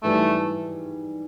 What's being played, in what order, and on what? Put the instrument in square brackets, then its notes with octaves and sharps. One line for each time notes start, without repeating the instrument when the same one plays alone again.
[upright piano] G#2 E3 G3 [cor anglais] A3